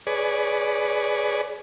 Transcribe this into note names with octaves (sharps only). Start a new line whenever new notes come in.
G#4 B4 C#5 D5